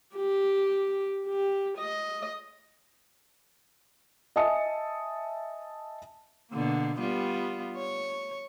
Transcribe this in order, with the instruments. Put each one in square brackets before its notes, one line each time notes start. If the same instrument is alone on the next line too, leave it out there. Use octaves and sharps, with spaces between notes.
[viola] G4
G4
D#5
[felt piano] D#5 E5 G#5 A5 D#6 C#7
[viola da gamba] B2 D3 A#3
G3 B3 F4
C#5